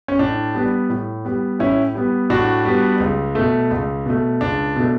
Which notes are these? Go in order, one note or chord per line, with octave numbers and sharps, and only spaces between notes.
C#4
A2 D4
G3 B3
A2
G3 B3
A2 C#4 E4
G3 B3
A2 D4 F#4
G3 B3
C#2
B2 A3
C#2
B2 A3
C#2 D4
B2 A3